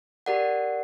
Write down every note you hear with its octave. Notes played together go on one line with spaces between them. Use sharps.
G4 A#4 D5 F#5